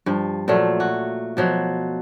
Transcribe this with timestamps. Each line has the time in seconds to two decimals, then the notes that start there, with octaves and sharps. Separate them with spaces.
0.06 G2 F3
0.48 A#2 F3 F#3 A3
0.80 F#4
1.37 B2 F3 F#3